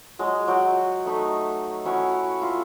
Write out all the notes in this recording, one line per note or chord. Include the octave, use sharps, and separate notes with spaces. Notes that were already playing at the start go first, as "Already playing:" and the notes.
F#3 G#3 D#5
F#3 F#4 G5
A3 D#4 E5
C#4 E4 F#4 C#5
F4 E5